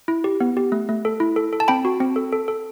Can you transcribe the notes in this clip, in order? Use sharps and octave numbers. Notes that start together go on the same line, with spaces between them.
E4
G4
B3
G4
A3
A3
A4
E4
A4
A4
A5
C4 G5 B5
F#4
C4
A4
A4
A4